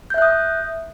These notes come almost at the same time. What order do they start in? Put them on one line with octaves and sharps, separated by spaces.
G6 E5 F#6 D#6